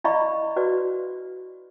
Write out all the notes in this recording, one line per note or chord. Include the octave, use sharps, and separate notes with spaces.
E4 D5 D#5 F5 B5 C#6
F#4 B4 D5